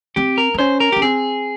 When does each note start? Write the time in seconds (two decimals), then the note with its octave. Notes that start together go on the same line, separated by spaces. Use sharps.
0.16 C4 G4
0.38 A#4
0.54 C4
0.59 C#4 C5
0.80 A#4
0.92 C#4 G4
1.02 C4 G#4